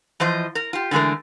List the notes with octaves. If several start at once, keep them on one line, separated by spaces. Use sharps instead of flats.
E3 F3 C5 D#5
A#4
F4 G4
D3 E3 G#3 A3 A#4